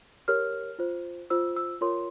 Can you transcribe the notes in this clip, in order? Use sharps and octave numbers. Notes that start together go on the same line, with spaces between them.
G4 A#4 C#5 F6
F4 C5
F4 C5 E6
E6
F4 A#4 C#5 C6